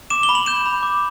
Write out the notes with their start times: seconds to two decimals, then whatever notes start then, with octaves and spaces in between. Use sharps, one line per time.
0.10 D6 E7
0.23 G7
0.29 B5
0.35 F#7
0.46 G6 E7
0.66 B5
0.83 D6